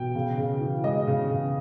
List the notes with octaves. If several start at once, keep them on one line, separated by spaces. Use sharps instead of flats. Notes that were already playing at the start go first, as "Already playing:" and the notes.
Already playing: B2 G5
C#3
C#3
E3
G#3 D#5
C#3
C#3